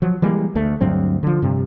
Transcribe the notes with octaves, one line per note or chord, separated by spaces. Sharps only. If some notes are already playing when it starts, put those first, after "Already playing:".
F3 F#3
E3 G3 G#3 A#3
D2 A3
D2 G2 F#3 C4
D3 F3
G2 C3